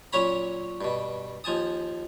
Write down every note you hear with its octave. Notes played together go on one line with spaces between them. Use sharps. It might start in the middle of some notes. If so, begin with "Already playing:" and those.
A#2 F#3 C#4 C#5 A#5 B5
G2 B2
D#2 F3 G#5 A5 D#6